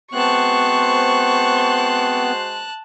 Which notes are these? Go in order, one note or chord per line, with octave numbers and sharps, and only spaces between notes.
G#3 B3 C4 F#4 C5 A5 C#6 F#6